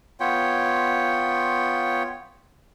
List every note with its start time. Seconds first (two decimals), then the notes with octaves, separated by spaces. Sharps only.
0.20 B3 F4 C#5 G5